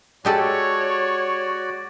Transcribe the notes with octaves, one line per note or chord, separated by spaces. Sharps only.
G#3 F#4 G4 A4 C#5 D5